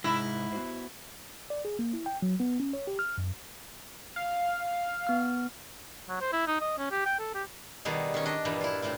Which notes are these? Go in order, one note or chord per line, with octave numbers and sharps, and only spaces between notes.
G#2 C3 G#3 E4 G#4
B3 F#4 C5
D5
G#4
A#3
E4
G5
F#3
B3
C#4
C#5
G4
F6
F#2
F5
B3 F6
F#3
C5
E4
D#4
D#5
C#4
G4
G5
A4
G4
B2 D#3 G3 G#4
D#3 C#4
D4 D#5
G2 A#2 E3 G3
E4 F4
A2 C3 C4 E4